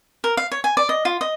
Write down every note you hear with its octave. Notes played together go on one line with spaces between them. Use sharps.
A#4
F5
C#5
G#5
D5
D#5
F4
D#5